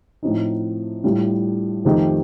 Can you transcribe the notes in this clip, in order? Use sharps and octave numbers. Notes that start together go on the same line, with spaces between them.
A2 F3 C4 D#4
A2 G3 D4 F4
F2 D#3 A3 D#4 G4